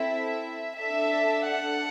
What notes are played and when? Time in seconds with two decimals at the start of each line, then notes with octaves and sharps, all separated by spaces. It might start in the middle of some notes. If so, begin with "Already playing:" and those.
Already playing: C4 E4 A4 E5
0.76 D4 A4 E5
1.47 F#5